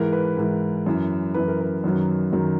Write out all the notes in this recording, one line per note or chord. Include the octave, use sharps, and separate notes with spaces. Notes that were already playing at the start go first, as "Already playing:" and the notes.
Already playing: G#2 E3 A#4
B4
G#2 E3 A#4
F#2 E3
F#2 E3 B4
A#4
B4
F#2 D#3 F#3
F#2 D#3 F#3